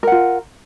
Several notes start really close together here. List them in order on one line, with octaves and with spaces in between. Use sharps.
A#4 F#5 F4